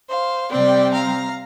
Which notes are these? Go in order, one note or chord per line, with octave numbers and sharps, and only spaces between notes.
C5 F5
C3 G3 C4 D5 G5
F5 A#5